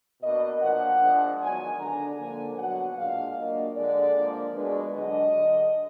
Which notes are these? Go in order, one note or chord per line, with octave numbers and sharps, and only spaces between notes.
B2 A#3 D4 D#5
A#2 F3 A#3 D4 F#5
F3 G#3 D4
D#3 F#3 B3 D4 G#5
D3 G#3 D4 A#5
D3 F3 A#3 G#5
B2 F#3 D4 F#5
A#2 G#3 D4 F5
A#2 F#3 A#3 D4 D#5
D3 G#3 D4 D5
F3 A#3 D4
B2 G#3 D4 B4
D3 F#3 D4 D#5
D3 F#3 D4